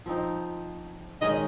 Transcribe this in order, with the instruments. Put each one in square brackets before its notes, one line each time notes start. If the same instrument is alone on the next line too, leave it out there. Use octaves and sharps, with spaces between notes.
[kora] F3 C4 D#4
[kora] D#3 G#3 C#4 [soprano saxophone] D#5